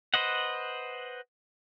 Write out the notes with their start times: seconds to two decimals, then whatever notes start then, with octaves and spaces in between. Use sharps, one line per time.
0.14 B4 C5 D#5 F#5